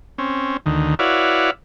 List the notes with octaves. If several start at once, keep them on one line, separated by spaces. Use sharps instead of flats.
C4 C#4
D2 D#3
E4 F#4 B4 C#5 D5 F5